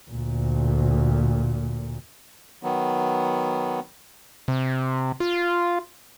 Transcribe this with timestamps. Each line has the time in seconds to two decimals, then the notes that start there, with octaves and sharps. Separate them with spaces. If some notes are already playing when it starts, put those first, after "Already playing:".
0.10 D2 A#2
2.63 D#3 F#3 B3
4.48 C3
5.20 F4